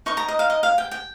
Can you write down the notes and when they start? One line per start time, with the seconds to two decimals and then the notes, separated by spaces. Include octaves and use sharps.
0.06 D#4 A#4 D#5 C#6
0.17 A#5
0.28 D#5
0.39 F5
0.50 D#5
0.63 F5
0.78 G5
0.91 G5